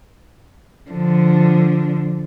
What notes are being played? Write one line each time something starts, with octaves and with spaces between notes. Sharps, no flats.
D3 F3